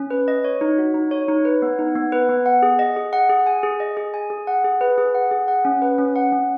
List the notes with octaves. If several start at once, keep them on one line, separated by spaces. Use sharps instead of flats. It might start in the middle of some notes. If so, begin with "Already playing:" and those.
Already playing: C#4
B4
D#5
C#5
D#4
F#4
D#4
C#5
D#4
B4
B3
D#4
B3
B4
B3
F#5
G#4
D#5
G#4
F#5
G#4
G#5
G#4
D#5
G#4
G#5
G#4
F#5
G#4
B4
G#4
F#5
G#4
F#5
C#4
B4
C#4
F#5
C#4